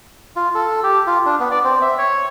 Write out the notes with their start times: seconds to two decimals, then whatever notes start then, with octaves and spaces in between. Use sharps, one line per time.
0.36 F4
0.55 A4
0.83 G4
1.07 F4
1.26 D4
1.40 B3
1.51 D5
1.64 C4
1.82 E5
1.98 C#5